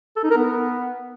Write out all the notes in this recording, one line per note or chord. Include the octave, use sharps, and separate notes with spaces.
A4
D#4
A#4
B3